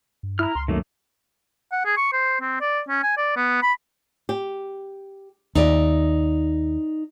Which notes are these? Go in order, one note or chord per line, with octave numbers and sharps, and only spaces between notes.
G2
E4 A#5 F6
C#2 C6
F#2 D#3 A3 A#3
F#5
G#4
C#6
C5
C4
D5
C#4
G#5
D5
B3
B5
G4
D#2 D#4 D5 E5